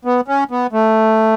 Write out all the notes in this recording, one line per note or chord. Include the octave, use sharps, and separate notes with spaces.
B3
C#4
B3
A3